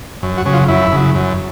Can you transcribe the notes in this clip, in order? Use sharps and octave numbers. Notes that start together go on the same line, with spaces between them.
F#2
F#4
C#3 F#3
F4
F#2 E4
C#3 F#3
F#2